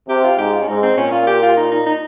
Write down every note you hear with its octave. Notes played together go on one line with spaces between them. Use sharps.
C3 G4
F4
G#2 G4
F4
C#4
G#2 D#4
C4
A#2 C#4
F4
G4
F4
D#4
D#4
D#4